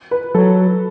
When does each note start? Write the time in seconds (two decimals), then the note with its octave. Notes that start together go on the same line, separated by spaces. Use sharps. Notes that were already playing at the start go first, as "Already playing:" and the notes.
0.11 B4
0.35 F#3 A4